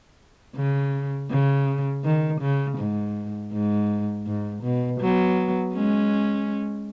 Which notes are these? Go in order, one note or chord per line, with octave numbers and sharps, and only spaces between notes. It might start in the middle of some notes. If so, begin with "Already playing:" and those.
C#3
C#3
D#3
C#3
G#2
G#2
G#2
B2
F#3 B3
G#3 C#4